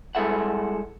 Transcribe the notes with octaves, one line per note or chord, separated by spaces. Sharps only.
G3 G#3 E4 A4 E5 F#5